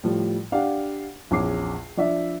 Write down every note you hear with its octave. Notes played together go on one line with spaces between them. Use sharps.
A2 F3 G3
D4 G4 F5 F#5
A#1 E2 C#4 D6 C7
F3 D4 D5 E5